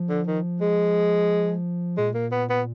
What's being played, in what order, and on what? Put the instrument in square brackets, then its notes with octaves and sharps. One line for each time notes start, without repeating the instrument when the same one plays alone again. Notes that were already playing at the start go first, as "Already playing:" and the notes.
Already playing: [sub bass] F3
[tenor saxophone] D3
D#3
G#3
[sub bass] A#2 [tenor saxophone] G#3
[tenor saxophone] A#3
B3
B3